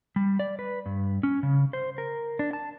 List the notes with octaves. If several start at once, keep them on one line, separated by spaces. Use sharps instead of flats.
G3
D5
B4
G2
C#4
C#3
C5
A#4
D4
A5